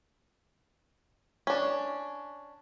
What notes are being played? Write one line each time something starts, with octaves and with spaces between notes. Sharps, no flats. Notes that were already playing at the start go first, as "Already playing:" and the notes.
C#4 D4